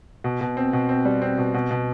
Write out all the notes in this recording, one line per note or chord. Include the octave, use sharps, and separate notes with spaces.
B2
B2
C4
B2
C4
G3
C4
B2
B2
B2